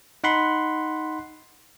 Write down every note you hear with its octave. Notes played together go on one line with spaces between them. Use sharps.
D#4 F#5 B5 C6